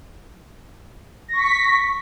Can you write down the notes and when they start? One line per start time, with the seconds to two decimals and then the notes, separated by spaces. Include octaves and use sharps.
1.28 A#6
1.33 C#6
1.38 B6